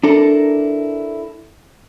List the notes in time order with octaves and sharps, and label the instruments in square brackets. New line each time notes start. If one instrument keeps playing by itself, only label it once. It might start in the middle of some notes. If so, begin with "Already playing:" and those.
[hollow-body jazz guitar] D4 E4 A4 A#4